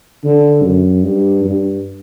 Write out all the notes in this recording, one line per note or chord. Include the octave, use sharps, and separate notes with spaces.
D3
F#2
G2
G2